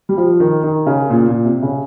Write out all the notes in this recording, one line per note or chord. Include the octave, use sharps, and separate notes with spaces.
G3
F3
D#3
D#3
C#3
A#2
A#2
C3
C#3